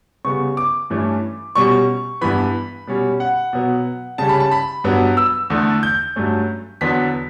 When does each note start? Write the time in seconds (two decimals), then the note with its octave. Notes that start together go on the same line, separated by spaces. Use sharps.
0.25 C#3 G3 B3 C#6
0.57 D6
0.90 G2 E3 A3 C#4
1.55 B2 G3 C#4 C#6
2.21 G2 E3 B3 B5
2.87 B2 G3 C#4
3.20 F#5
3.53 B2 F#3 B3
4.18 C#3 G3 C#4 A5
4.29 B5
4.40 A5
4.52 B5
4.84 G2 F#3 B3
5.17 E6
5.50 E2 D3 A3
5.83 G6
6.16 G2 F#3 A3 C#4
6.81 E2 D3 F#3 B3 B6